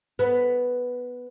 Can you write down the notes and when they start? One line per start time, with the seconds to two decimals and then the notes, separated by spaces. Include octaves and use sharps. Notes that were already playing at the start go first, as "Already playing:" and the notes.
0.19 B3